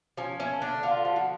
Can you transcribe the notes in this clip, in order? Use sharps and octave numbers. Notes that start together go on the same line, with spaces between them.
F3 C#4
A3 C#4
D3 D4
D3 F4
F3
F#4